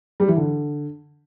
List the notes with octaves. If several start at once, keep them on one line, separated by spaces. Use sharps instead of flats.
G3
E3
D3